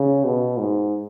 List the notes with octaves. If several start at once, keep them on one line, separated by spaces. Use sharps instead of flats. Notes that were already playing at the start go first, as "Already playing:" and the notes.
Already playing: C#3
B2
G#2